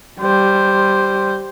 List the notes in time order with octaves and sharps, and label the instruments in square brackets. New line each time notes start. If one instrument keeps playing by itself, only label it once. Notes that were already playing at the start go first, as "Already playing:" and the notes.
[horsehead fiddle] G3 C5